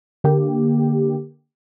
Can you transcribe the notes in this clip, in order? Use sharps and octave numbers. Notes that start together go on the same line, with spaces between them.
D3 A#3 G4